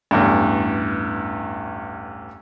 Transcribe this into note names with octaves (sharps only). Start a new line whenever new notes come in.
A1 E2 G2